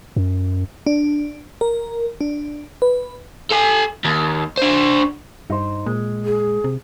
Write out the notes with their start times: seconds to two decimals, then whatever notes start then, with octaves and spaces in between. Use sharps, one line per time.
0.16 F#2
0.87 D4
1.61 A#4
2.21 D4
2.82 B4
3.51 A4 G#5
4.05 D#2
4.57 D4 C5
5.50 G2 D#4 C5
5.86 A#2 G#3
6.25 G#4
6.64 C3